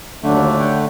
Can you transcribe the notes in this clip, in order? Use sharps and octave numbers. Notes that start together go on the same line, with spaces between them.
D#2 D3 F#3 A3 D4
C#5 F#5 G5